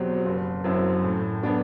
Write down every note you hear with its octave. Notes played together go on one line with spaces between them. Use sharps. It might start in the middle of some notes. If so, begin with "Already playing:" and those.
Already playing: E2 B2 F#3 C4 G4
F#1
F#2 F#3 C4 E4
A2
F#3 B3 D4 F#4